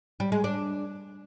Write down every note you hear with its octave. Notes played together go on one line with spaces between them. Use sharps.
G3
G#3
D4